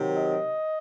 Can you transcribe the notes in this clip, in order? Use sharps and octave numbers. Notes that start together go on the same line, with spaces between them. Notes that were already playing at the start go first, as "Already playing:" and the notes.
Already playing: C3 D#3 F#3
D#5